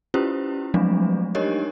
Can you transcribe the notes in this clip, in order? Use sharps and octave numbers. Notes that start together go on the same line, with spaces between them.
C#4 E4 F4 G4 B4 C5
F3 F#3 G#3 A3 C4 D4
D4 D#4 G4 A#4 C#5 D#5